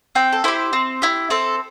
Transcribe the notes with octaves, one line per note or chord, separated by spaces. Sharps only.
C4 G5
A4
E4 G4 C5
C4
E4 G4
C4 A4